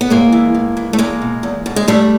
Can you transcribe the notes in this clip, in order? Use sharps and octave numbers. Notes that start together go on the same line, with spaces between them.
B3
A2 G#3 A#3
E3
A2
E3
A3
E2 G#3 A#3
B2
E2
B2
G#3
G2 G3 A3